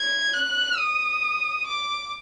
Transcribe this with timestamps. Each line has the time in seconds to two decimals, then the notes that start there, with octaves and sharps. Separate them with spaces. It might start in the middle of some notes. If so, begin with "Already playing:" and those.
Already playing: G#6
0.34 F#6
0.78 D#6
1.67 D6